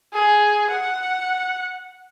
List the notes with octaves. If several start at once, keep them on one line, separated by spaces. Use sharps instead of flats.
G#4
F#5